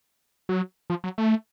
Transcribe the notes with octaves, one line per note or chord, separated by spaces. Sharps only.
F#3
F3
F#3
A3